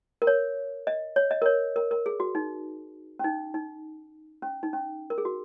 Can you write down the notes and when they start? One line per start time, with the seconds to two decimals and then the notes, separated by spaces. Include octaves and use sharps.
0.22 A#4
0.27 C#5
0.87 D#5
1.16 C#5
1.31 D#5
1.42 A#4
1.46 C#5
1.76 A#4
1.91 A#4
2.06 G#4
2.20 F#4
2.35 D#4
3.19 C#4
3.24 D#4
3.54 D#4
4.42 C#4
4.63 D#4
4.73 C#4
5.10 A#4
5.18 G#4
5.25 F#4